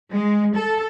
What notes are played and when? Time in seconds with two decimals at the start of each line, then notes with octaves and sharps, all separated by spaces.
0.11 G#3
0.56 A4